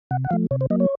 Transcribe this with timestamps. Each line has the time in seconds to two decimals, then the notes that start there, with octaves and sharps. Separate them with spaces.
0.11 C3 F#5
0.25 F#5
0.30 F3 A3 F5
0.51 C3 C#5
0.61 C5
0.70 F#3 A#3 D#5
0.80 C#5